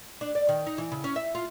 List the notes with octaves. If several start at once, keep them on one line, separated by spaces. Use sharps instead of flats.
D4
D5
D#3
D#4
E3
C#3
C#4
E5
F4